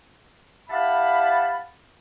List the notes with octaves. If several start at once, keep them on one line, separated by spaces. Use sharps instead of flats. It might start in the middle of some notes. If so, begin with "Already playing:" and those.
E4 G4 F5 F#5 A5 B5